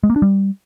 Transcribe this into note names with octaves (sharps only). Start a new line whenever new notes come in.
G#3
A#3
D4
G3